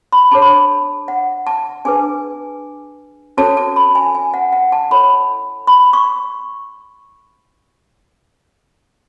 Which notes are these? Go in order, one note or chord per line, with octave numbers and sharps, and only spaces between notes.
B5
D4 G#4 C#5 A5
B5
A5
F#5
A5
D4 G#4 B4 G#5
C#4 F#4 A4 C#5 A5
A5
B5
G#5
G#5
F#5
F#5
A5
E4 A4 C#5 B5
B5
C#6